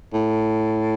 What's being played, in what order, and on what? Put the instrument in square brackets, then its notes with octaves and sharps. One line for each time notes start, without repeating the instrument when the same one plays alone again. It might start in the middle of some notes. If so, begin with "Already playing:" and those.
[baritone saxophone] A2